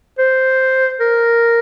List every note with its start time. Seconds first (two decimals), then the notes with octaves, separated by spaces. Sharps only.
0.18 C5
1.00 A#4